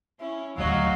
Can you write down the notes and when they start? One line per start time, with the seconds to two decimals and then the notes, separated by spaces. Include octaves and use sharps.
0.20 C#4 E4
0.58 D#1 D2 F#3 A3 F#4 D#5 F5